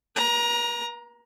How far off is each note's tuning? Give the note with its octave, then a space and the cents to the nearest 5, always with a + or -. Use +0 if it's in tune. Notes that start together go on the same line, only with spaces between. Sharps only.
B4 -45 A#5 +20